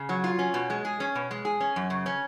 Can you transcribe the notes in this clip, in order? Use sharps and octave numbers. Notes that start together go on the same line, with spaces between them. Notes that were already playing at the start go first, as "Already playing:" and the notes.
Already playing: C#3
F#3
F4
C#4
B2
G#3
G#4
C#4
B2
G#3
G#4
C#4
F#2
C#3
C#4